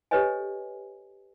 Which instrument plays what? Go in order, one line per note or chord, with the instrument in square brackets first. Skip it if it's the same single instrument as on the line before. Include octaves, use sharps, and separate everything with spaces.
[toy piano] G4 A4 B4 C#5 D#5 G#5